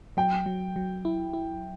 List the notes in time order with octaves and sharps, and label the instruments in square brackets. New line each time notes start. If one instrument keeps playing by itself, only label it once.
[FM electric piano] F#3 [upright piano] G5
[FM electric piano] F#3
F#3
E4
E4